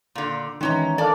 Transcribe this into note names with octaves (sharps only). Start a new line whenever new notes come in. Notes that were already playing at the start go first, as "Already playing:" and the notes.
A#2 D3
D#3 E3 G#3 C#4 A#5
A#3 D4 A4 D5